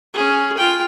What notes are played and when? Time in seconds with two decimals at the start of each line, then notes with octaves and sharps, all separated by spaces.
0.13 C#4 G#4
0.57 F4 G5